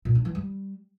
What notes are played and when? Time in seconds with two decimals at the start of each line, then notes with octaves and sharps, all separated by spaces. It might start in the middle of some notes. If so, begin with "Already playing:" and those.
0.05 A#2
0.15 D4
0.25 E3
0.35 G3